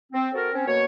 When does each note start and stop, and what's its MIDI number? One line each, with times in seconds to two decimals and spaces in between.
0.12 0.28 60
0.34 0.48 60
0.34 0.48 66
0.34 0.48 69
0.34 0.48 70
0.53 0.65 60
0.53 0.65 61
0.66 0.84 42
0.66 0.84 47
0.66 0.84 58
0.66 0.84 73